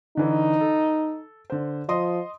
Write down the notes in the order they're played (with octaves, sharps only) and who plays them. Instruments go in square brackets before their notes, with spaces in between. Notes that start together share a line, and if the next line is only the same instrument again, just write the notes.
[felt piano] D3 E3 [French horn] D#4
[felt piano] A4
D3 C5
[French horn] F3 [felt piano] D#5 C6 D#6